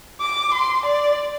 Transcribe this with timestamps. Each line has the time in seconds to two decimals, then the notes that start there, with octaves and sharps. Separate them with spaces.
0.21 D6
0.54 C6
0.86 D5